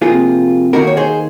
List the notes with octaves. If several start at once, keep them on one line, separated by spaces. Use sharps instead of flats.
C3 F3 A#3 F4 G#4
D#2 D#3 A#3 D#4 F#4 A#4
C#5
G#4 C5